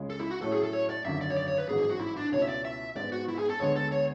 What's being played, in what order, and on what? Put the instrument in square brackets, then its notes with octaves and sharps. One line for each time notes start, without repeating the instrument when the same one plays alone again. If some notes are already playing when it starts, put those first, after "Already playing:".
Already playing: [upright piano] C#2 C#3 G#3 C#4
[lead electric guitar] A4
E4
F#4
[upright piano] A2 F#3 A3 C#4 [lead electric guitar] A4
[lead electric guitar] G#4
A4
C#5
D5
[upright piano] G#1 F#2 D3 [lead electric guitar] E5
[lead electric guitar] D5
C#5
D5
C#5
B4
[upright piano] A1 G#2 F#3 [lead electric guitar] G#4
[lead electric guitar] G#4
F#4
E4
D4
[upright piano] C#2 B2 A3 C#4 E4 [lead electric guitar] C#5
[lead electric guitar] E5
D5
E5
[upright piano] G#2 G#3 B3 [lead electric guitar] D5
[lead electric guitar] F#4
E4
G#4
A4
[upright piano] D2 D3 G#3 B3 [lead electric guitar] C#5
[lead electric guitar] A4
C#5